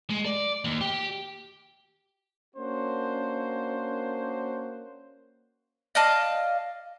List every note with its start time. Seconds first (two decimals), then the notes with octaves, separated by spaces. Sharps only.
0.10 G#3
0.25 D5
0.65 D#2
0.81 G4
2.55 A#3 C#4 D4 F#4 C5
5.95 D5 D#5 F5 A5